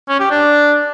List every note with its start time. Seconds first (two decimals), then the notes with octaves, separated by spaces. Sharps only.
0.09 C#4
0.20 G4
0.31 D4